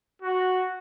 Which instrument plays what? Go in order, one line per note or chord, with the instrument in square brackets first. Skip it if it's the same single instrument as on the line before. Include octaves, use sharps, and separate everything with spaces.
[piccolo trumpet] F#4